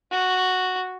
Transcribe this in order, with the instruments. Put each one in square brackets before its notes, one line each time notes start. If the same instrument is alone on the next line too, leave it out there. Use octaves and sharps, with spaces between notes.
[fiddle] F#4